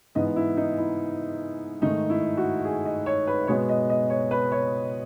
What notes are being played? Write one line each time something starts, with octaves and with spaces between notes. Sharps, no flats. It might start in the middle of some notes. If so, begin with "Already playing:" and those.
G#2 E3 B3 D#5
E4
D#4
E4
G#2 D#3 A3 D#4
E4
F#4
G#4
D#5
C#5
B4
B2 G#3 B3 C#5
D#5
D#5
C#5
B4
C#5